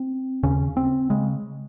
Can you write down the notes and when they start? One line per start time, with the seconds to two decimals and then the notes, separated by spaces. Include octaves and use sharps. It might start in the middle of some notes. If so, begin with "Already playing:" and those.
Already playing: C4
0.43 D#2 C#3 C#4
0.77 C4
1.10 C#3 G#3